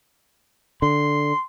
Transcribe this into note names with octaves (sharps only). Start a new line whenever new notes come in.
D3 C6